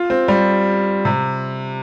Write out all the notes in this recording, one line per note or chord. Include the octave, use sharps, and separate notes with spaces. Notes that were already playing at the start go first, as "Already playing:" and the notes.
Already playing: F4
C4
G3
C3